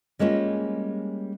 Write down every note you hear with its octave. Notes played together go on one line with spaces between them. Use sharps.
G3 G#3 A#3 C#4 F4